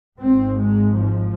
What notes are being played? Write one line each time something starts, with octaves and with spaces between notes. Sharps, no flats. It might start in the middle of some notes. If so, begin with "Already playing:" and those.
G#1 G#2 C4
G#3
F3